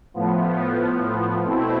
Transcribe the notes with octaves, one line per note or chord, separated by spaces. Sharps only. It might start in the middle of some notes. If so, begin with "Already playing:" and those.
A2 F3 B3
B2 A3 C4 E4